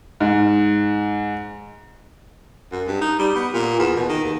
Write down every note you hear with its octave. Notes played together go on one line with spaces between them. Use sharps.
G#2
F#2
G2
D#4
G3
B3
A#2
E2
B2
D#3
D#2